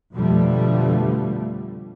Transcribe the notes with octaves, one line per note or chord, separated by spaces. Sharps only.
F2 B2 D3 F3 G3 A3